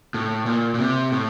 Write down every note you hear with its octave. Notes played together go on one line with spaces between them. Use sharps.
A2
A#2
A#2
C3
A2